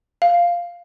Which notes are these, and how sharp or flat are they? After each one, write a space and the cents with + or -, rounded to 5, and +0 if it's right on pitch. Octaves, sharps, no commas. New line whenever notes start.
F5 -5